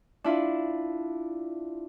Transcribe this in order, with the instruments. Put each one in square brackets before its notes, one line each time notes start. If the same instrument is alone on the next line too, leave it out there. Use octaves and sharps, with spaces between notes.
[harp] D4 E4 F4